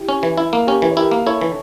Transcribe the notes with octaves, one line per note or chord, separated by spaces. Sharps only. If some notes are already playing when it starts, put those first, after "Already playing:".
Already playing: E4 G4
C#4
E3
E4
A#3
C#4 G4 A#4
E3
C#5
E4 G4 A#4
A#3
E4 A4 C#5
E3